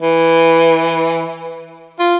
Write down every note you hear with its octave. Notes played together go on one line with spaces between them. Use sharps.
E3
F4